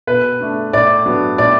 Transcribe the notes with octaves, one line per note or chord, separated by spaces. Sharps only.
B2 B4
A3 D4
A2 D5
F#3 B3 D4
A2 D5